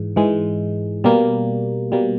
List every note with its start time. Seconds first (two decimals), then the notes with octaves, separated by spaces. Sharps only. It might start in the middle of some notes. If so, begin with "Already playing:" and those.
Already playing: G#2 E3 G#3
0.16 G#2 E3 G#3
1.04 B2 G3 A#3
1.92 B2 G3 A#3